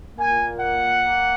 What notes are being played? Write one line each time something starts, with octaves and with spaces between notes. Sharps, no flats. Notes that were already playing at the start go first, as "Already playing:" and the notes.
A#2 A#3 G#5
F#5
A#3